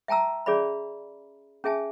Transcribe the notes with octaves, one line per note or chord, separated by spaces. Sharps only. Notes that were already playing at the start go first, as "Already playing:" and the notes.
E5 G5 A5 A#5 E6
C#4 G#4 D5 E5 B5
C#4 G#4 E5 G#5 A5